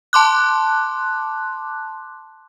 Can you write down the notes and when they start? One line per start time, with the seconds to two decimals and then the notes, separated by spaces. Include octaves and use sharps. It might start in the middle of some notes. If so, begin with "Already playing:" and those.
0.13 A5 C6 D6 F#6